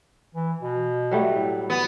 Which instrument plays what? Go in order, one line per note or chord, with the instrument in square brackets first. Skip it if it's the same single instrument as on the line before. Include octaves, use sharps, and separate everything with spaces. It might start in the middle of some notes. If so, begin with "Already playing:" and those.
[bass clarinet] E3
B2
[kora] F#3 G3 A3
[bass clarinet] A2
[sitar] B3